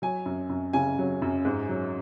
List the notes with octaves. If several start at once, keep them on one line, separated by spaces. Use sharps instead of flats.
F#3 G#5
F#2
F#2
C#3 G#5
F#3
F#2
G#2
F#3